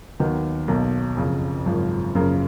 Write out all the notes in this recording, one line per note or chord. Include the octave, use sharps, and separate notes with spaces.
D#2 D#3 F#3 B3
B1 B2 A#3
F#1 F2 C#3
G#1 F#2 C#3 F3
F#1 F#2 C#3 F3 A#3